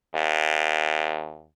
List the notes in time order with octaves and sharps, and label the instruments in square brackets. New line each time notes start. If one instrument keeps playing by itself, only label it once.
[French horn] D#2